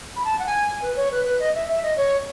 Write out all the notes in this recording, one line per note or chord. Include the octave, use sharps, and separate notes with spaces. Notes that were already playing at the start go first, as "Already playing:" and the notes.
B5
A5
F#5
G#5
G#5
B4
C#5
B4
B4
D#5
E5
E5
D#5
C#5